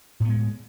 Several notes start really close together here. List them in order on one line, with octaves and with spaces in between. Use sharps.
A2 B3 G#3